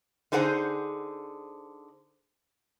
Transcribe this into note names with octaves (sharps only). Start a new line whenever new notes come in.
D3 D#4 G#4 C5 F#5